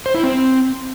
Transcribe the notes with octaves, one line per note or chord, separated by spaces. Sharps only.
C5
E4
C4